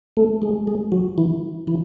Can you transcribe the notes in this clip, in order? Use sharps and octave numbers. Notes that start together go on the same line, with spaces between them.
A3 A4
G#3 G#4
G#3 G#4
F#3 F#4
E3 E4
E3 E4